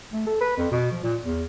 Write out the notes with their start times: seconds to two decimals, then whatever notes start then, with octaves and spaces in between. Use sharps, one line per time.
0.13 A3
0.27 A4
0.41 B4
0.57 F2
0.71 B2
0.91 F3
1.03 A#2
1.24 E2